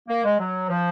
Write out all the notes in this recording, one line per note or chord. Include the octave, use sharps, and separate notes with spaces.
A#3
G#3
F#3
F3